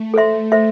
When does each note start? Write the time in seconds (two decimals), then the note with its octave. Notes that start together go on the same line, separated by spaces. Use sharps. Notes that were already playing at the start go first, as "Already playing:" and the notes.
Already playing: A3
0.14 A4 C5 E5 C6
0.52 A4 C5 E5 C6